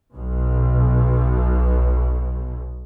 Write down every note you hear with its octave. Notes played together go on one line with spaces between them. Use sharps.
B1 B2